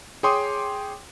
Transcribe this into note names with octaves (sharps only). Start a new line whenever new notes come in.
G#4 C#5 G5 C6 D6 D#6